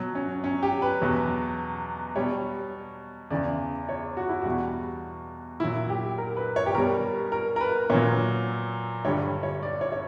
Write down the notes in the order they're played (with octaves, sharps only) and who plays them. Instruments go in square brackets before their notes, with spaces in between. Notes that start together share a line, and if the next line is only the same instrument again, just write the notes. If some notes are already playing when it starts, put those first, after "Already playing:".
Already playing: [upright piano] B2 F#3
C#4
C#4
G4
B4
E2 B2 F#3
B2 G3 C#5
E2 C#3 E3 D5
C#5
F#4
E4
E2 B2 G3 F#4
A#2 F#3 E4
G4
A#4
B4
C#5
G4
B2 G3 A#4
A#4
A#4
B4
A#2 F#3 C#5
G2 D3 G3 C#5
C#5
D5
C#5
C#5